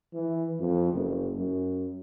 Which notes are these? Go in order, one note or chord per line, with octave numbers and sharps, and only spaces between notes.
E3
F2
F#1
F#2